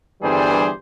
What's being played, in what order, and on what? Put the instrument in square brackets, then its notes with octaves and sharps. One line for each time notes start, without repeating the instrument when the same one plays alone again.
[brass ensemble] G1 E3 G3 D4 G#4 C5